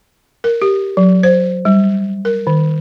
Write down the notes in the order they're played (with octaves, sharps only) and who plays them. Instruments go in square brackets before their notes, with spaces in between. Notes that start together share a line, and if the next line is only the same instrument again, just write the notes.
[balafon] A#4
G4
F#3
C5
G3
A#4
D#3